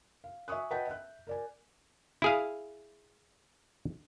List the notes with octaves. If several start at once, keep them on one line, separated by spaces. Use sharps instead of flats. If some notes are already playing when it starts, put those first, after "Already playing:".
F5
E5 G#5 C#6 D#6 F#6
B4 D#5 F#5 G5 A5 G6
E5 F#6
A#4 D5 G#5
E4 G#4 F5